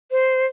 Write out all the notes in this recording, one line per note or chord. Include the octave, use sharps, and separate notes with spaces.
C5